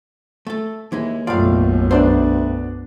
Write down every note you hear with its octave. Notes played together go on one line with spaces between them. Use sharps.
A3 A4
D#2 E3 G#3 E4
B1 F#2 A2 F4 D5 F5
D2 B3 D4 C5 D5 E5